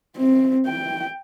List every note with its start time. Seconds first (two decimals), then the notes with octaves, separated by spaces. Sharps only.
0.17 C4
0.66 G5